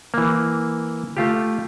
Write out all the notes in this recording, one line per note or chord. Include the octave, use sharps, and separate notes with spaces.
E3 A#3
A3 F4 G4